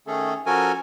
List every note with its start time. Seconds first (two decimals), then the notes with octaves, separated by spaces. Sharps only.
0.07 D#3 A3 C#4 G#4 A4
0.46 F3 C#4 F#4 A4 A#4 G#5